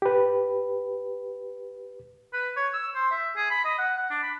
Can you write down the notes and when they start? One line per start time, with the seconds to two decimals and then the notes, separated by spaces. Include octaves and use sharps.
0.02 G4 B4
2.33 B4
2.56 C#5
2.74 E6
2.95 C5
3.11 E5
3.37 G#4
3.51 B5
3.65 D#5
3.78 F#5
3.97 F#5
4.10 D4
4.23 B5